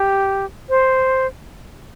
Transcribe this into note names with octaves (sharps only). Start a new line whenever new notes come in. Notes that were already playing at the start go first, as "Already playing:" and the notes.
Already playing: G4
C5